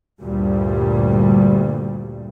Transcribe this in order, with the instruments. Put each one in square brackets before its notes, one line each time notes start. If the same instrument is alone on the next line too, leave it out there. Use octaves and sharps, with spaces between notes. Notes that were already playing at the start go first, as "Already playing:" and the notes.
[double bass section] D2 G2 A#2 G3